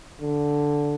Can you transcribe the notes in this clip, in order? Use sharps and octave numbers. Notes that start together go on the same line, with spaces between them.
D3